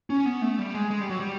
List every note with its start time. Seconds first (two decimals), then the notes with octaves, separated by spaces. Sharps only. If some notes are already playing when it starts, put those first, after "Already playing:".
0.10 C#4
0.26 B3
0.42 A3
0.59 G3
0.74 G#3
0.90 G#3
1.01 G3
1.10 F#3
1.20 G3